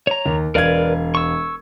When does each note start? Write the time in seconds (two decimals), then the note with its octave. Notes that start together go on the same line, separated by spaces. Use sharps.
0.07 C#5 A#5
0.26 D#2
0.55 E1 A#4 B4 D5 F5 G#6
1.15 C#6 E6